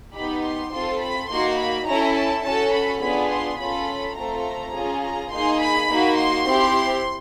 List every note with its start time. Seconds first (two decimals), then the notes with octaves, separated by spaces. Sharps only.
0.15 B3 D#4 G4 B5
0.44 C6
0.72 C4 F4 A4 C6
1.01 B5
1.30 A#3 D#4 F#4 C6
1.58 B5
1.87 C#4 E4 A4 A#5
2.16 A5
2.44 C#4 F#4 A4 A5
2.73 B5
3.01 B3 D4 F4 G#4 B5
3.30 C6
3.59 C#4 F4 A4 B5
4.16 A3 C4 F4 A4 A#5
4.74 C#4 F4 G#4
5.02 A#5
5.31 A#3 D#4 G#4 C6
5.60 B5
5.88 A#3 D#4 F#4
6.17 C6
6.46 C4 E4 G4